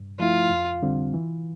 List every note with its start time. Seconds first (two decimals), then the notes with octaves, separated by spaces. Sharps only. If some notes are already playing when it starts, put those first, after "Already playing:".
Already playing: G2
0.19 F3 A3 E4 F4
0.50 F2
0.83 D3 G3 C4
1.14 E3